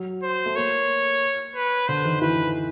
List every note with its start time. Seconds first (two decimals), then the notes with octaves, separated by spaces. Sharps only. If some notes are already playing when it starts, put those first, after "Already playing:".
Already playing: F#3
0.22 C5
0.46 A3
0.56 A#3 C#5
1.55 B4
1.88 D3 C5
2.05 D#3
2.21 E3 B4